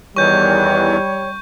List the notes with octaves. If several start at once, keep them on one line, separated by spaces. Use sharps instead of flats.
E2 D#3 E3 G3 C#5 C#6 G6